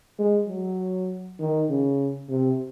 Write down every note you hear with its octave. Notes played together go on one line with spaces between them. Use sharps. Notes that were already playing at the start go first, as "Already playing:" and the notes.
G#3
F#3
D#3
C#3
C3